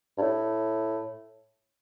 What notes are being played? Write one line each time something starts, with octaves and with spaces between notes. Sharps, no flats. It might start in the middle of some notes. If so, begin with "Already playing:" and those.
G2
A2